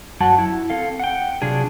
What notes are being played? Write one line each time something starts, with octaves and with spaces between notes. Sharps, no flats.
F#2 F#3 F#4 A5
E4
C4 A4 F5
F#5 G5
C3 F#3 D4 F4 G#4